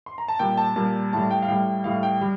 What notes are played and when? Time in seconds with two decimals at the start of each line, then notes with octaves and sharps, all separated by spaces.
0.06 C6
0.18 A#5
0.28 A5
0.39 A#2 G3 G5
0.57 A5
0.76 A#2 G3 A5
1.13 A2 G3 A5
1.31 G5
1.42 F5
1.48 A2 G3 G5
1.84 A2 G3 F5
2.03 G5
2.21 G3